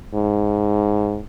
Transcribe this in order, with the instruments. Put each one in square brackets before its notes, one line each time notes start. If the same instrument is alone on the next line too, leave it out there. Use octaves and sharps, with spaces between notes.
[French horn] G#2